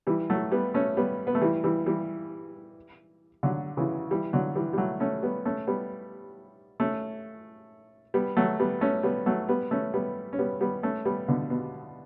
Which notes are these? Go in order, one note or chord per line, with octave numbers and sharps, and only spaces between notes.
E3 G3
F#3 A3
G3 B3
A3 C#4
G3 B3
B3
A3
E3 G3
E3 G3
E3 G3
D3 F#3
C#3 E3
E3 G3
D3 F#3
E3 G3
G3
F#3 A3
A3 C#4
G3 B3
A3 C#4
G3 B3
A3 C#4
G3 B3
F#3 A3
G3 B3
A3 C#4
G3 B3
F#3 A3
G3 B3
A3 C#4
G3 B3
C#4
G3 B3
G3 B3
A3 C#4
G3 B3
B2 D3
B2